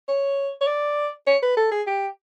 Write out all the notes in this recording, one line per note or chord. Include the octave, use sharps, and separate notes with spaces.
C#5
C#5
D5
C#5
B4
A4
G#4
G4